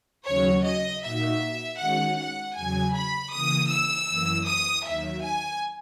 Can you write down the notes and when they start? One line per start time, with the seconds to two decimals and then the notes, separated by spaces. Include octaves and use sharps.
0.26 D#2 C#3 F#3 C#4 F#4 C#5
0.65 D#5
1.03 A#2 A#3 D#4 F#4 E5
1.79 D#3 G#3 C#4 F#4 F#5
2.18 F#5
2.56 E2 C#3 F#3 G#5
2.95 B5
3.32 C#3 E3 A#3 D#6
3.71 E6
4.09 F#2 E3 A#3
4.47 D#6
4.86 D#2 D#3 F#3 E5
5.23 G#5